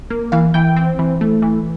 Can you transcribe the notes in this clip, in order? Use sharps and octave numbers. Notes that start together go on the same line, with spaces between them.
A#3
E3 F5
E3 G5
C4
E3
A3
E3